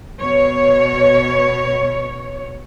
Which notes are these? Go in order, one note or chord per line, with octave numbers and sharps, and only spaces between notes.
B2 C#5